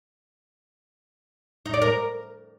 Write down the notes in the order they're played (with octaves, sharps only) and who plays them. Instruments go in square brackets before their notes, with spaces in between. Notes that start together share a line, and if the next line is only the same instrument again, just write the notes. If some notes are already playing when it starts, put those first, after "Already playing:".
[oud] D#4
D5
A#4